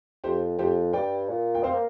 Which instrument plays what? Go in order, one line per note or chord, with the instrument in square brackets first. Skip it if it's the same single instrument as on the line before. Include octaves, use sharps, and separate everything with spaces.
[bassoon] F2 [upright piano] G4 C5
[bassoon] F2 [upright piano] G4 C5
[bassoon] G2 [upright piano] D5 G5
[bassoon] A#2
[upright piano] G5
[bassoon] C4 [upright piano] C5 F5
[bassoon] A#3